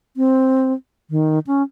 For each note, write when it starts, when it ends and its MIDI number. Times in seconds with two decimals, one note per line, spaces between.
0.17 0.73 60
1.10 1.39 51
1.47 1.63 61